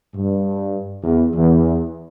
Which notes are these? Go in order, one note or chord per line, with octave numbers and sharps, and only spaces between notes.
G2
E2
E2